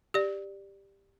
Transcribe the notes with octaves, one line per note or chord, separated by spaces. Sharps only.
G4 D5